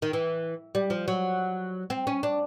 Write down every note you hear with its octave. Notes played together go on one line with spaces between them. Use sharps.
D#3
E3
G3
F3
F#3
C4
C#4
D4